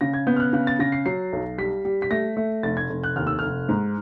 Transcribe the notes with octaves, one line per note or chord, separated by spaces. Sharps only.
C#3 A#6
G#6
B3 G6
F6
F#6
C#3 F#6
A6
C#3 A#6
C7
F#3 C7
B1
G3 B6
G3
B6
A3 A#6
A3
F1 A6
G#6
F1
F#6
D#2 F6
E6
F1 F6
G#2